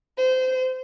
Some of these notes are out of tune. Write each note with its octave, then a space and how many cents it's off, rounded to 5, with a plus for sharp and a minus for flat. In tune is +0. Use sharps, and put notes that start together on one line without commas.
C5 -25